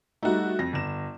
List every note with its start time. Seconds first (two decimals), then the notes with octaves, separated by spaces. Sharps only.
0.23 G3 A3 D#4 F#4
0.59 F2 A#6
0.73 G1 E7